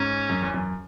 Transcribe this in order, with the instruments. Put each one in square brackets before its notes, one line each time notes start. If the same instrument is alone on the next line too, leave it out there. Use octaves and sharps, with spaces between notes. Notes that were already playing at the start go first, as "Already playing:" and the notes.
Already playing: [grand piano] G#2 [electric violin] C#4
[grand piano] F#2
E2
F#2